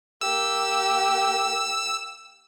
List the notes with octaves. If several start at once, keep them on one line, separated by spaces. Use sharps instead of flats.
A#3 G4 E6